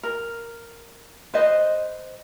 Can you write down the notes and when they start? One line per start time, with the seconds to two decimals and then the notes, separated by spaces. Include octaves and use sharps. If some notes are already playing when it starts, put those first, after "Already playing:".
0.03 A#4
1.34 B4 C5 D#5